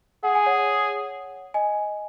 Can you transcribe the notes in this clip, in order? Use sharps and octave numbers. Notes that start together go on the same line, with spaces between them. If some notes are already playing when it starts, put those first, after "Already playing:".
G#4 F#5
G#5
C#5 F#5
D#5 G#5